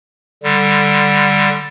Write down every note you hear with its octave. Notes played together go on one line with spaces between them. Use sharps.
D3 G3